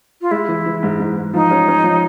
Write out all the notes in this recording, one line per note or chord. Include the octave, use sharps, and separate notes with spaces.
F4
G#3 E4
E3
E3
G#2
G#2
G#2
F3 D#4
C#4
C#4
F3